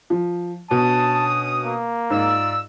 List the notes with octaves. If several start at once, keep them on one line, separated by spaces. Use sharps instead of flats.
F3
B2 C#4 D4 A5 D#6
A#3
G#2 F4 D5 E6